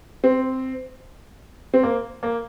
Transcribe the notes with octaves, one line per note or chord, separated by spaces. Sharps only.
C4
C4
A#3
A#3